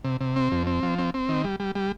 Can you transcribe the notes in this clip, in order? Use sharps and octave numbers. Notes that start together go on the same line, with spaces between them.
C3
C3
C4
F2
C4
F3
C4
C4
D#3
G3
G3
G3